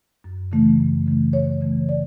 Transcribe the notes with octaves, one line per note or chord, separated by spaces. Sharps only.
F#2
C#3 E3 A3
F#2
C#3 E3 A3
F#2 C#5
C#3 E3 A3
D5